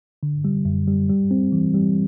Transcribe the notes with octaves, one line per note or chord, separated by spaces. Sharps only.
D3
G3
F#2
G3
G3
C4
E3
G3